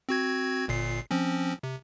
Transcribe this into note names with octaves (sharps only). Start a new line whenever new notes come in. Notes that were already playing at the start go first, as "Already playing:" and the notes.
C4 F#4 G#6
G1 A#2 C7
F3 C4 C#4
C3